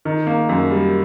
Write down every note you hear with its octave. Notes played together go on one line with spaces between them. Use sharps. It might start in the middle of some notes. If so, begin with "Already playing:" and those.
D#3
A#3
F#2
G3